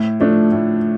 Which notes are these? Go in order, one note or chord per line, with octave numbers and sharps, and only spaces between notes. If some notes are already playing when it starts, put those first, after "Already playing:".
Already playing: A2
F3 A3 D4
A2